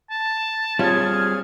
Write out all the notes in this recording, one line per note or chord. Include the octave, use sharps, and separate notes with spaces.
A5
G3 C4 F4 G#4 C#5 F6 G#6